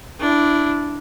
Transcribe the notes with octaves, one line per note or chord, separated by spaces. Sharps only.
D4 E4